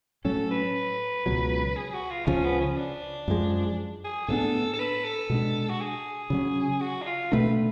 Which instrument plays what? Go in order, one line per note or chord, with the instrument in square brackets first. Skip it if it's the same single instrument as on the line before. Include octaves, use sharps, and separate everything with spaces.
[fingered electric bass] A2 F#3 C#4 [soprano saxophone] A4
[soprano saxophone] B4
[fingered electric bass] C#2 B2 F#3
[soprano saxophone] G#4
F#4
F4
[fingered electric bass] C#2 C#3 F3 [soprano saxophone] C#4
[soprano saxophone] B3
C#4
D4
[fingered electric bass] F#2 F3 G#3
[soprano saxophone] G#4
[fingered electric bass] A2 F#3 B3 D4 [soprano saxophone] A4
[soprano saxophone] A4
B4
A4
[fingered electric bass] B2 G#3 D4
[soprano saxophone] F#4
G#4
[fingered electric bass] C#3 F#3 C#4
[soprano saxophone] F#4
D4
F4
[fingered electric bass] B2 A3 D4 [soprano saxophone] B4